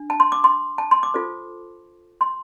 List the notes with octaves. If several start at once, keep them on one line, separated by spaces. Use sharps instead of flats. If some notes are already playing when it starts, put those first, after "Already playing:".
Already playing: D4
A5
C6
D6
C6
A5
C6
D6
F4 A4 C5
C6